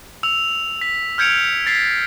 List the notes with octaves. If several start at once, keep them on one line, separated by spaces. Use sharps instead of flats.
E6 F7
B6
F6 G6 G#6 C#7 D7 F7
A6 B6 C7